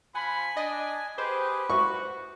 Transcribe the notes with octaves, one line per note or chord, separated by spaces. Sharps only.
F3 F#5 G#5 B5
D4 D#5
G4 G#4 B4 C5
F#4 C#6